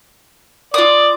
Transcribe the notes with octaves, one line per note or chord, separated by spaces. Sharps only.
F4 D5 D#6